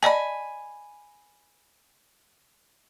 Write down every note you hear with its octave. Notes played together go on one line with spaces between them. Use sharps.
D5 D#5 G#5 A5 B5